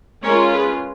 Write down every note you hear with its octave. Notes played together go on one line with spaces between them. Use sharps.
G#3 C#4 F4 A#4 C#5
G#4 B4